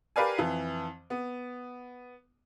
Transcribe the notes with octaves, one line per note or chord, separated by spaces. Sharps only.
G4 A#4 B4 D5 F5 G#5
F2 E3
B3